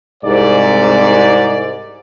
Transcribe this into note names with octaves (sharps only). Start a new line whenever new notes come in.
C2 G#2 D5